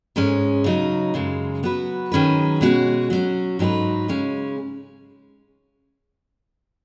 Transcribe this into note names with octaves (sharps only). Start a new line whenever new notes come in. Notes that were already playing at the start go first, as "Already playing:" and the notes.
G#2 G#3 C#4
C#3 F#3 D#4
F#2 C#3 G#3
F#3 B3 F#4 B4
D#3 F#3 C#4 G#4 B4
B2 G#3 C#4 F#4
F#3 C#4 F#4
G#2 F#3 D#4 G#4 B4
C#3 G#3 C#4